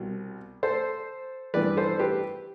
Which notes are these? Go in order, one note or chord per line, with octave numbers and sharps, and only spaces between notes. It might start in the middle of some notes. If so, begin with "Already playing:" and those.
Already playing: C2 B2 G3
A4 C5
G2 E3 B3 B4 D5
A4 C5
G4 B4